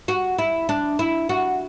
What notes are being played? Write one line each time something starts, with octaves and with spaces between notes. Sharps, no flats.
F#4
E4
D4
E4
F#4